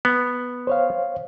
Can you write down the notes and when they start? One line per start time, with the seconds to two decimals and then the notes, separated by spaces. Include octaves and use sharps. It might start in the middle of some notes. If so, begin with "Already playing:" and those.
0.05 B3
0.67 C5 C#5 F5